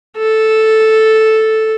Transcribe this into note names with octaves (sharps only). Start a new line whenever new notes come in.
A4